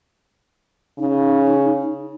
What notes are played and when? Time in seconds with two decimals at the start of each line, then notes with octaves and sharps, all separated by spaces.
0.99 C#3 D#4